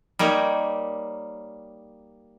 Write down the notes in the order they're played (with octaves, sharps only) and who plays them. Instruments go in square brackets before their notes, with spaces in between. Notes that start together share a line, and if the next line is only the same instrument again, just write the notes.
[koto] G3 A#3 D#4 C#5